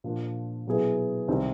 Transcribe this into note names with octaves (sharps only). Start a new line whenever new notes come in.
A#2 F3 A#3 D4
B2 F#3 B3 E4 G#4
C2 C3 D#3 G3 C4